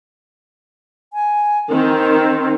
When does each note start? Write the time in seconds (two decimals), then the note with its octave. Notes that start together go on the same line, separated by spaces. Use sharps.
1.13 G#5
1.69 D#3 C4